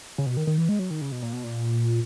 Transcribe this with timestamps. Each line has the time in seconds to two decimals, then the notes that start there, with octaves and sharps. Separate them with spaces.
0.18 C#3
0.26 B2
0.37 D#3
0.47 D#3
0.58 E3
0.69 G#3
0.79 F#3
0.90 D#3
1.01 C#3
1.12 B2
1.22 A#2
1.33 B2
1.44 A#2